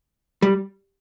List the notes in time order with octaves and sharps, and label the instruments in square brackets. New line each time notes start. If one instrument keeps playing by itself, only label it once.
[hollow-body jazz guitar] G3